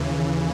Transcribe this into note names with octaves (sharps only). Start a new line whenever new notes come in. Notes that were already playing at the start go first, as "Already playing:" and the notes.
Already playing: D#2 C#3 E3